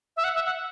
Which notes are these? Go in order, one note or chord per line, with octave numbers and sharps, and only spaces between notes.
E5
F#5
E5
F#5